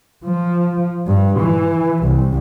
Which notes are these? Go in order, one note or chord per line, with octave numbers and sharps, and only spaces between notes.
F3
G2
E3
C2